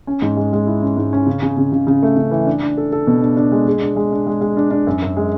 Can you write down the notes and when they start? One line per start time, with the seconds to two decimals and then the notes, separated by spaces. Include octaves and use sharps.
0.07 C#4
0.22 G#2
0.37 G#3
0.53 G#3
0.67 E4
0.82 C#4
0.97 G#2
1.13 C#4
1.27 C#3
1.42 C#3
1.57 C#3
1.72 C#3
1.87 C#3
2.03 A3
2.17 C#3
2.31 E3
2.46 D4
2.62 D4
2.77 A4
2.92 A4
3.07 B2
3.22 D4
3.37 D4
3.52 G#3
3.67 G#4
3.82 D4
3.96 G#3
4.12 D4
4.27 G#3
4.41 G#3
4.57 D4
4.71 D4
4.87 F#2
5.02 F#2
5.16 G#3